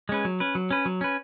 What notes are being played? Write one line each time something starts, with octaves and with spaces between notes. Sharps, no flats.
G#3 C#4 B4
F#3
C#4 B4
F#3
C#4 B4
F#3
C#4 B4